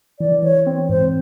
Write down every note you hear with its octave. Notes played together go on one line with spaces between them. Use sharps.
E3 D5
E3 C#5
C4
G#2 C5